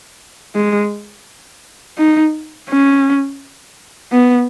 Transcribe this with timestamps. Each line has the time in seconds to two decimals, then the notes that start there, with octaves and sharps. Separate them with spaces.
0.55 G#3
1.98 D#4
2.69 C#4
4.12 B3